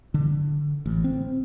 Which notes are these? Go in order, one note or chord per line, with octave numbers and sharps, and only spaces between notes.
D3
A1
C4